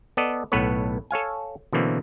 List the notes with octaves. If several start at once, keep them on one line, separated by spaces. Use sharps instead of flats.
B3 A4 D5 D#5
B1 A2 B3 A4 B4 C#5
A4 C#5 F5 G#5
B2 D3 E3 A#3 C4